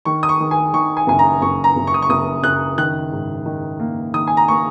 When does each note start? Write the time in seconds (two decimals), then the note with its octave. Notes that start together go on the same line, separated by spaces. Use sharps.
0.05 D#3 C#6
0.23 D#6
0.29 C#6
0.40 D#3
0.51 G#5
0.73 D#3 C#6
0.97 G#5
1.07 F#1 G#5
1.19 A#5
1.42 F#1 C#6
1.64 A#5
1.76 F#1
1.87 C#6
1.94 D#6
2.02 C#6
2.09 F#1 D#6
2.43 F#1 F#6
2.78 D#3 F#6
3.12 G#2
3.46 D#3
3.80 A#3
4.14 D#3 D#6
4.27 G#5
4.37 A#5
4.48 A#3 C#6